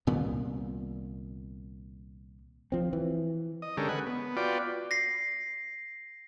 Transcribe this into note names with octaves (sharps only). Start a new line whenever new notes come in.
C2 A#2 D#3 B3
F3 C4
E3
D#5
D3 G#3 C#4 G4 A4 A#4
B4 F#5 G#5
B3
F4 F#4 B4 D5 G5
A#6 C7